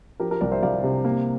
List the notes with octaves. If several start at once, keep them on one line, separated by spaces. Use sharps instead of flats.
F3 G4 A#4
G4 A#4
C2 A#4 D5
C5 E5
C2 D5 F5
C3
A#3